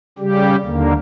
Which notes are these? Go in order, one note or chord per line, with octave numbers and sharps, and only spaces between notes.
C#3 G3 G4
D#2 D3 A#3